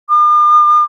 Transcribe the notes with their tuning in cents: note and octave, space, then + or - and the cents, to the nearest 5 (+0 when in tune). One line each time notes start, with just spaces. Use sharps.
D6 +45